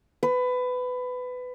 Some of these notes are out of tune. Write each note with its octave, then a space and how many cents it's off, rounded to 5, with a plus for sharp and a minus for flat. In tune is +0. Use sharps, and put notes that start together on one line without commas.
B4 +20